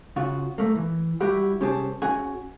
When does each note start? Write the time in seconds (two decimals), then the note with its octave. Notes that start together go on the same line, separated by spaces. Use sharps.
0.16 C#3 F4 F#4
0.58 A#2 A3 A#3
0.75 E3
1.21 G3 E4 F#4 G4 F#5
1.60 C2 C#4 G4 G#4 C5 A5
2.02 C#4 F#4 G#4 F#5 G#5